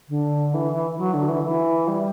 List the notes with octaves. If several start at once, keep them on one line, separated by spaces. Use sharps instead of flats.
D3
E3
F#3
D3
E3
E3
G3